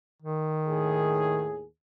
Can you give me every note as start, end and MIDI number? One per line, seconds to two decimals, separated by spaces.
0.22 1.47 51
0.68 1.64 39
0.68 1.64 45
0.68 1.64 68